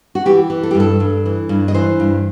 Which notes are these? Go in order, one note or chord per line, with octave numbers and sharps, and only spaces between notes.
F#4
E3 G4
E3
A4
G4
G2
A4
G2
E3
G2
D#5
E3 C5
G2